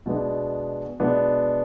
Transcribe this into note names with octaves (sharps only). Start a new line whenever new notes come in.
B2 G#3 B3 D4
B2 G#3 B3 D4